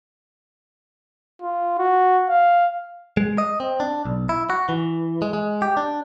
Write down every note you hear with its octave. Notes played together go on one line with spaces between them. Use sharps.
F4
F#4
F5
G#3
D#5
C4
D4
B1
E4
F#4
E3
G#3
G#3
G4
D4